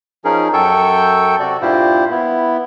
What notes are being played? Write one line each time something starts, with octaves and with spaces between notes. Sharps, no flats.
F3 C#4 D#4 G#4 A#4
F#2 A4 G5 C#6 E6 G6
C3 F#4 D5
G2 A#2 E4 F4 G4 C5
B3 E4